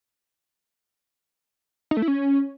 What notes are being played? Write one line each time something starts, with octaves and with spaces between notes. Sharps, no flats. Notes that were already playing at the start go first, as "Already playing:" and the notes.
D#4
A3
E4
C#4